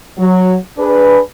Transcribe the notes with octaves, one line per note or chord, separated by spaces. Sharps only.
F#3
D4 G#4 B4